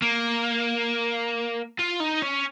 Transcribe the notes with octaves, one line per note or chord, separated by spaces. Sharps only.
A#3
F4
D#4
C#4